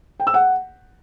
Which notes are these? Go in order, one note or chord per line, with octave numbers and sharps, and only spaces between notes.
G5
E6
F#5